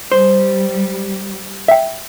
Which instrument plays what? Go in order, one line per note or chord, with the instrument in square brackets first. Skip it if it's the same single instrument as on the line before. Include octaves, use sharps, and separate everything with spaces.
[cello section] G3 [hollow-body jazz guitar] C5
[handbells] E5 G5